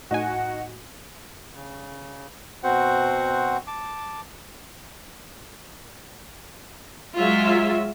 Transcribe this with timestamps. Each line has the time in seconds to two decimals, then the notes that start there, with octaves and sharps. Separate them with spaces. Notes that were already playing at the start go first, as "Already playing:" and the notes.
0.11 A2 D#4 F#4 F#5 G#5
1.55 C#3
2.63 B2 C4 F#4 C5 F#5
3.67 A5 D6
7.17 F#3 G#3 F4 E5